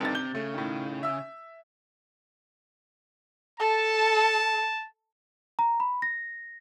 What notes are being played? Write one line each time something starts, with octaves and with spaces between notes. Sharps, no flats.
G1 C3 D#3 A6
G6 G7
C#3 A3
A2 D#3
E5 E6
A4 A5
A#5
B5
A#6